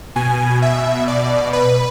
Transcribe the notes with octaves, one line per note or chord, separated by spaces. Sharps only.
B2 G#5
E5
D5
B4